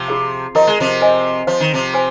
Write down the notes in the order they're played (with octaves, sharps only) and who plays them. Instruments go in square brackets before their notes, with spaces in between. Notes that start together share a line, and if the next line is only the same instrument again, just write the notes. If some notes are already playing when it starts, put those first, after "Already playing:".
Already playing: [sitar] C3 F3
[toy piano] F4 G#4 F5
[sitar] F3 [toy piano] A#4 D#5 A#5
[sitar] G#3
C3 F3
[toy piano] C5 D#5 G#5
[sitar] F3 [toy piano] C5 F5 C6
[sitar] D#3
C3 F3
[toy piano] C5 G#5 C6